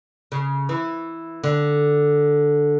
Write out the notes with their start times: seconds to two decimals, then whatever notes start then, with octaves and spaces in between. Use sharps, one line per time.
0.32 C#3
0.69 E3
1.44 D3